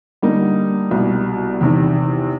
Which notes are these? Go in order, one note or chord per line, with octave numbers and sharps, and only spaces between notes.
D3 G3 A#3 D#4
C2 B2 G3
E2 C3 D#3